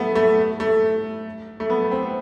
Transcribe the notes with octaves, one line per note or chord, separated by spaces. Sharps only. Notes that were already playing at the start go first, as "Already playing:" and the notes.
Already playing: A3 B3
A3
A3
A3
B3
C4